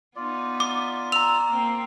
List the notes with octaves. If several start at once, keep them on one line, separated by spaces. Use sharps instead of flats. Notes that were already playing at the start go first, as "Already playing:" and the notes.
B3 D#4 F4 D5
D6
A#5 E6 F7
A#3 C4